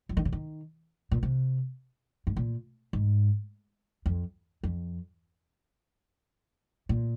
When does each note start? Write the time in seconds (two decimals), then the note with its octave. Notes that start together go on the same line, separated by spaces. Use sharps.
0.09 F3
0.17 D#3
0.25 C#3
0.33 D#3
1.11 A#2
1.23 C3
2.27 G#2
2.37 A#2
2.93 G#2
4.06 F2
4.63 F2
6.89 A#2